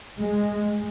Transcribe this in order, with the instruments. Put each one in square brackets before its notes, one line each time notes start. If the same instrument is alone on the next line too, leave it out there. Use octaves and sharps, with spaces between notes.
[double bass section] G#3